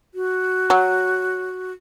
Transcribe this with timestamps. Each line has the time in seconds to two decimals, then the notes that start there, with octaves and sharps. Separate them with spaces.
0.14 F#4
0.70 F#3